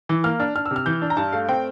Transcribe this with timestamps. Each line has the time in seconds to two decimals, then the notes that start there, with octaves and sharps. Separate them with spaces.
0.09 E3
0.24 A#3 F6
0.40 D4 F6
0.55 D4 F6
0.66 E6
0.71 C3
0.76 F6
0.86 E3 G6
1.02 D4
1.10 A#5
1.17 G2 A5
1.32 A3 F5
1.49 C4 G5